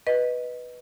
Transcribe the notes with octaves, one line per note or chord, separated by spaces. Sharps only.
B4 D#5